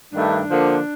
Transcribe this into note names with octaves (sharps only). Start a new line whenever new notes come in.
G2 D#3 A3 D4
D3 F3 A#3